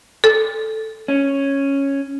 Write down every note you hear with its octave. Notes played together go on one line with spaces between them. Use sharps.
A4
C#4